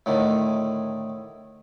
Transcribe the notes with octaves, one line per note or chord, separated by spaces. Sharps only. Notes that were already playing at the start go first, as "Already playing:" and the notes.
A2 D3 D#3